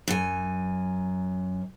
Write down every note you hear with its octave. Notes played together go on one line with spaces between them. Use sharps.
F#2 G#5